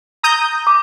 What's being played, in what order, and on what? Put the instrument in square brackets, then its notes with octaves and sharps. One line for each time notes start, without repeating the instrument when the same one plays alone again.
[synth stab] A#5 D#6 G6
[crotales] D6